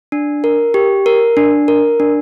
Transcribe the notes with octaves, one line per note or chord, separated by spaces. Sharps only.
D4
A#4
G4
A#4
D4
A#4
D4